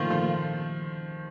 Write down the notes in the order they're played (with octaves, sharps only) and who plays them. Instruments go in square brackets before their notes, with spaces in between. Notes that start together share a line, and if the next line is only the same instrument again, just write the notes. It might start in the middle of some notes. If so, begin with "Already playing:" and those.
Already playing: [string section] A#2 A3 F4 [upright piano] D#3 F3
[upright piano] F3